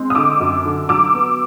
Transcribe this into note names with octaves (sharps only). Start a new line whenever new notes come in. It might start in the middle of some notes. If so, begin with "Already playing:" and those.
Already playing: G#3 C4
D#6
D3 D6 E6
F#2
D3
F#3 D6 E6
B3